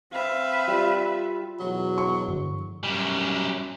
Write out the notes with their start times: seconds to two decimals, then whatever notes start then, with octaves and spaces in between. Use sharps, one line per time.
0.13 C4 B4 E5 F5
0.68 G3 F4
1.60 E1 F#3
1.98 C#6
2.28 G2 D3 F3
2.84 F#2 G3